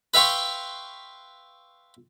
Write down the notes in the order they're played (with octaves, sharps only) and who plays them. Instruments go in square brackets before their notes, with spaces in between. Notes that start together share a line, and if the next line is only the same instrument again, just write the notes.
[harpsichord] B4 E5 F5 G5 C6 C#6